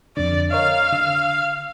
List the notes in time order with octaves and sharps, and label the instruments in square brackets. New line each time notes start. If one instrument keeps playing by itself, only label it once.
[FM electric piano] F2 D3 [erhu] D5
[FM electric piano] A#4 C#5 D#5 [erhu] F5
[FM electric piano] D3 E6